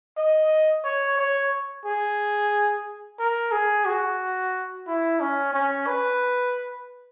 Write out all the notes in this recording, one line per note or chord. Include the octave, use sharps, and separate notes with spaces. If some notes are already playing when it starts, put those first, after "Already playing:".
D#5
C#5
C#5
G#4
A#4
G#4
F#4
E4
C#4
C#4
B4